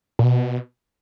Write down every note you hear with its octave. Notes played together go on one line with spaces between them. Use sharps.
A#2
B2